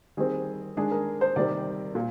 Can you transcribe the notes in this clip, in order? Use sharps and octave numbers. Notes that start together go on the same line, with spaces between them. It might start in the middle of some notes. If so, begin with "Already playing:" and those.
D#3 G3 C4 G#4
D#3 G#3 D4 G#4
A#4
C5
C3 D#3 G3 C4 D5
A#2